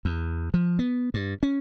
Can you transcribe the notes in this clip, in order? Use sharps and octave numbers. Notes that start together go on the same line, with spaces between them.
E2
F3
B3
G2
C#4